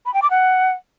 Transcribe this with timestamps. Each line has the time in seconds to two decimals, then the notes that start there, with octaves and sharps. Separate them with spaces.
0.06 B5
0.14 G5
0.22 D6
0.30 F#5